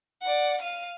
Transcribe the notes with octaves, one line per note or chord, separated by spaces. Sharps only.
D5 F#5
F5 D#7